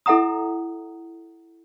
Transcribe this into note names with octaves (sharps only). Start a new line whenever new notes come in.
E4 A4 E5 F#5 A#5 D#6